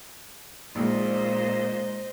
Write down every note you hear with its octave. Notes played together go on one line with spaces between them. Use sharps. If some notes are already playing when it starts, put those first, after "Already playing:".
A#1 A#2 G#3 D#4 C5 D#5